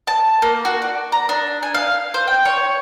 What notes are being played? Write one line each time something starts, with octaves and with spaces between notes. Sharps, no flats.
A5
A#3
F#4
D5
A#5
D4
G#5
F5
C5
G5
C#5